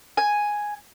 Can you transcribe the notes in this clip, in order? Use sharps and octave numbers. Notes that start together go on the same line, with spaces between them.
G#5